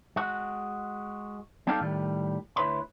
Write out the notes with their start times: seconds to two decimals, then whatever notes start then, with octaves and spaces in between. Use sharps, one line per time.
0.16 G#3 F#4
1.67 G3 C4 D#4 G4 A4 F5
1.80 A2 D#3 G3
2.56 D2 E4 B4 C#5 B5 C6